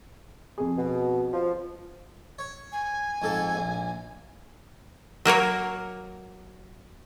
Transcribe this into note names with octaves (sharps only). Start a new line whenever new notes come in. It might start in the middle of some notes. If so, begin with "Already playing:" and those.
F2 G#4
B2
F3
C#5
G#5
F2 G#2 A4
A#1
F#3 A#3 A#4 C#5